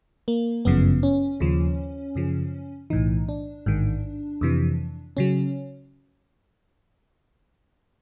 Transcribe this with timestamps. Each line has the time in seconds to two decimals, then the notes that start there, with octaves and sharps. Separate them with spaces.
0.28 A#3
0.65 G1 F#2 C#3 F3 B3
1.03 C#4
1.40 D#2 C#3 F3
2.15 F#2 C#3 F3
2.90 B1 A2 E3 D#4
3.29 D4
3.66 A1 G#2 D#3
4.41 F2 C3 E3
5.17 C#3 F#3 C#4